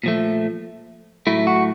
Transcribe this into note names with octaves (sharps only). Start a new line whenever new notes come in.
A#2 F3 A3
A2 F#3 A3 E4
F#4